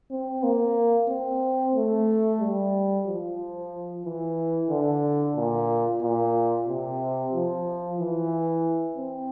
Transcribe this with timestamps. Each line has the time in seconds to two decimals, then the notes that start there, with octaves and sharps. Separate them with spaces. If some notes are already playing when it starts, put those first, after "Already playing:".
0.11 C4
0.43 A#3
1.09 C4
1.74 A3
2.41 G3
3.07 F3
4.05 E3
4.70 D3
5.36 A#2
6.02 A#2
6.68 C3
7.33 F3
7.99 E3
8.97 C4